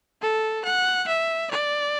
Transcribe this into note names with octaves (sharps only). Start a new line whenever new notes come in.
A4
F#5
E5
D5